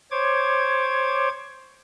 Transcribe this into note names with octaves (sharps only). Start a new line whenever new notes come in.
C5 C#5 D6 G#6